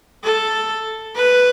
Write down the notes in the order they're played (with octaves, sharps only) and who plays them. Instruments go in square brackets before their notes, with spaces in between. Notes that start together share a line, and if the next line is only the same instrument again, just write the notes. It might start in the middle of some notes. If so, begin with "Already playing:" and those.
[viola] A4
B4